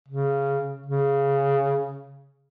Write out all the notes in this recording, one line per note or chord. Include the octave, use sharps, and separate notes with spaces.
C#3
C#3